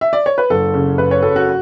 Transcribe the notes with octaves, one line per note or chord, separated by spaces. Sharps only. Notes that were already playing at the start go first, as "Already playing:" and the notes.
E5
D5
C#5
B4
F#1 A4
C#3
F#1 B4
C#5
F#2 A4
F#4